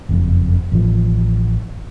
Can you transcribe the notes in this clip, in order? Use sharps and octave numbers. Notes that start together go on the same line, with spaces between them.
F#1 F2
A1 F3